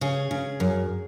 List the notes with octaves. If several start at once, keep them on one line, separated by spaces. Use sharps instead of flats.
C#3 G#4
C#3
F#2